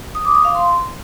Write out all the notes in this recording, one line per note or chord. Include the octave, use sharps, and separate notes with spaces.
D#6
D6
D#6
F5
C6